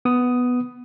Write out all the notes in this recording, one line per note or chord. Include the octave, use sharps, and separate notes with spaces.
B3 D#6